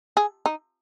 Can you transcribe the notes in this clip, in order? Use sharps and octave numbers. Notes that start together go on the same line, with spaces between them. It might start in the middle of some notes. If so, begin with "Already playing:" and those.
G#4
D#4